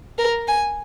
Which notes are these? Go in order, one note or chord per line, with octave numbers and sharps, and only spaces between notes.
A#4
G#5